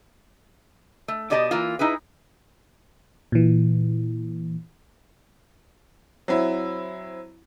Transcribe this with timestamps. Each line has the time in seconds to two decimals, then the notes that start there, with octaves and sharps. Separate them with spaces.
1.08 A3
1.30 B2 G4 D5 D#5 A5
1.51 E3 A#3 F4
1.79 D#4 E4 G#4 B4
3.32 A#2 E3
6.28 F#3 C4 E4